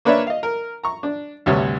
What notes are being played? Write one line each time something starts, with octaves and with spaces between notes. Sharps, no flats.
A#3 D4 B4 C#5 D5 E5
D#5 F5
A#4
A#5 C#6
D4
D2 G2 C3 C#5